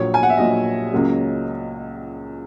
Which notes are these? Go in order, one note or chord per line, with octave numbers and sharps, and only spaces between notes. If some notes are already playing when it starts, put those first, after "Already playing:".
Already playing: A#1 A#2 F#3 C#5
G#5
F#5
E5
A#1 A#2 F#3 D#5
C#2 C#3 F#3 A#3 C#4